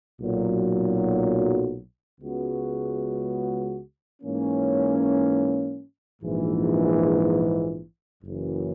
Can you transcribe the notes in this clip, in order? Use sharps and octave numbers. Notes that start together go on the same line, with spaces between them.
B1 A#2 F#3
C#2 C#3 G#3 B3 F#4
G#2 E3 A#3 C#4
A#1 G#2 E3
F#1 F#2 E3